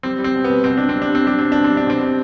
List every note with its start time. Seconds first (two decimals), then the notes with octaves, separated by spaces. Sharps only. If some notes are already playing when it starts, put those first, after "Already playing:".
0.03 G3 C4
0.19 G3
0.24 C4
0.35 B2
0.44 B3
0.49 B2
0.64 B2 C4
0.77 B2 D4
0.89 C4
0.95 G3
1.02 D4
1.10 G3 C4
1.26 G3 D4
1.39 B2 C4
1.52 B2 D4
1.64 C4
1.70 G3
1.77 D4
1.87 B2 C4
2.01 G3